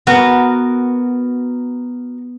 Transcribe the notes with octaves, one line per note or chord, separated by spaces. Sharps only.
B3 F#4 A#4 A#5